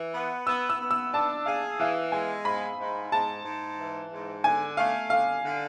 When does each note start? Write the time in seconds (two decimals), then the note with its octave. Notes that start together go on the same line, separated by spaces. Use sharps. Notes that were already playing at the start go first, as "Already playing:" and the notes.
Already playing: E3
0.14 B3
0.47 B3 E6
0.69 E6
0.80 B3
0.91 E6
1.14 D4 A5
1.46 G#4 F5
1.80 E3 F5
2.12 G#3 G#5
2.45 G#2 B5
2.79 G#2
3.12 G#2 A5
3.45 G#2
3.78 E3
4.11 G#2
4.44 D3 G#5
4.77 A3 F5
5.10 D3 F5
5.44 D3